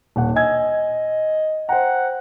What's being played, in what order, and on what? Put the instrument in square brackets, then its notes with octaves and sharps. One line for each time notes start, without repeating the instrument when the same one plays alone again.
[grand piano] D#1 F#5
[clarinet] D#5 [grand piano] G#5 E6 G#6
[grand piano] C5 G5 A#5 [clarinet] F#5